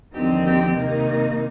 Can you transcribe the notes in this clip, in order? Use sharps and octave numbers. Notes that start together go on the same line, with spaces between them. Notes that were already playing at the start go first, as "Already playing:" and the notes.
D#2 D3 F3 C4 D#4 G4
G4
C3 D#3 A#3 D#4